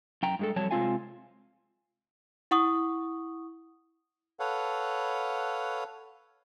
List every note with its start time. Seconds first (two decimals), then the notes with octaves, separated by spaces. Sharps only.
0.23 F#2 G5 A#5
0.39 G2 G#3 A4
0.56 F2 F#3 G3 C#5 A5
0.71 C3 G#3 C4 F4 F5 G#5
2.51 E4 F#5 C#6 D#6
4.40 A4 B4 C#5 F5 F#5